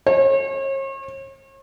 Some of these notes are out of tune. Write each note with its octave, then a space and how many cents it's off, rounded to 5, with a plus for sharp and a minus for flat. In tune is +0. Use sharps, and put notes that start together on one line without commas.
C#5 -40